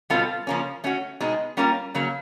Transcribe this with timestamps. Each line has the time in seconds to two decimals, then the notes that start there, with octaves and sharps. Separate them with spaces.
0.10 B2 G3 C4 F4 A4
0.47 C#3 F3 A#3 C#4
0.84 A3 C#4 F#4
1.20 B2 G#3 C4 D#4
1.57 G3 A#3 C#4 F4 A#4
1.95 C#3 F#3 A#3